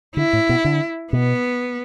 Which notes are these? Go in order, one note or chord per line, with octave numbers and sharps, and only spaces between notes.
D3 E4
A2
B2
D3
B2 B3